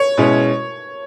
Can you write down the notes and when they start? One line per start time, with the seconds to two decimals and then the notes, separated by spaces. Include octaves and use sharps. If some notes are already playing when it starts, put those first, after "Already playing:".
Already playing: C#5
0.17 B2 G#3 C#4 E4